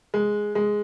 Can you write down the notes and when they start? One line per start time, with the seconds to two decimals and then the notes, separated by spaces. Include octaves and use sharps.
0.14 G#3
0.55 G#3